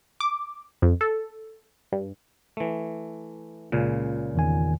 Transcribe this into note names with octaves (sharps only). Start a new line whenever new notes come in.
D6
F2
A4
G2
E3 A3
C#2 A#2 C#3
E2 D#3 G#5